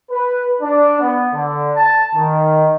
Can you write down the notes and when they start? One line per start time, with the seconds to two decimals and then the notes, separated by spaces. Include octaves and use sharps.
0.10 B4
0.61 D4
1.00 B3
1.33 D3
1.75 A5
2.15 D#3